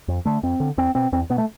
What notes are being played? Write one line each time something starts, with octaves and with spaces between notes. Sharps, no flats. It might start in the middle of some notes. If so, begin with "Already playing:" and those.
F2
D3 A3
F2 C4
D3
E2 C4
B2 C4
E2 C4
B2 B3
A3